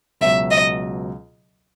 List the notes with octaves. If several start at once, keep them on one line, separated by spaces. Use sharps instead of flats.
C#2 B2 F#3 E5
D#5